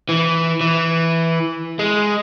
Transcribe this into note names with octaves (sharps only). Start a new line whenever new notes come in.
E3
E3
G#3